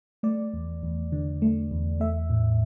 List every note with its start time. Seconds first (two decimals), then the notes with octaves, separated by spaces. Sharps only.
0.23 A3 D5
0.54 E2
0.83 E2
1.12 D3
1.42 A3
1.71 E2
2.00 A3 E5
2.30 A2